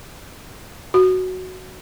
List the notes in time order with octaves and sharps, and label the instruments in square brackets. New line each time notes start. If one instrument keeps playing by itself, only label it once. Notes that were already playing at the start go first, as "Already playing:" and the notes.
[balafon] F#4